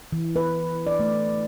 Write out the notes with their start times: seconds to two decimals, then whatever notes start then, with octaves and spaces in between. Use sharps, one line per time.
0.12 E3
0.36 B4
0.87 D5
0.99 A3